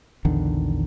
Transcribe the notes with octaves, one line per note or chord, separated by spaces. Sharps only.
A#1 E2 D3 D#3